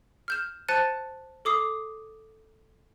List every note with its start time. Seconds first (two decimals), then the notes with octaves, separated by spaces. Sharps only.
0.28 F6 G6 E7
0.69 C5 A5 F#6 A6 C#7 D#7
1.45 A4 D6 D#6 C7